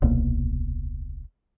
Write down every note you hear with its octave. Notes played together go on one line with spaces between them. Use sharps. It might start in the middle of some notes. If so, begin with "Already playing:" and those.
D#1 C2 B2 A#3